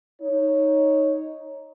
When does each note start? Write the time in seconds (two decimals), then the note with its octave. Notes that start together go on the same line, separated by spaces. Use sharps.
0.21 D#4 C#5